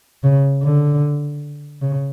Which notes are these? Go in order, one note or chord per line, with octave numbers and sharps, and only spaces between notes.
C#3
D3
C#3